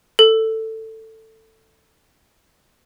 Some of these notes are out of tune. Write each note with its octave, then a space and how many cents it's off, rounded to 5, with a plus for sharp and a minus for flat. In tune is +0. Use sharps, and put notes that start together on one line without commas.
A4 +15